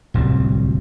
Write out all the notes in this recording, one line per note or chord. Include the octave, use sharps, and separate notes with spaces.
D1 C2 G3 C4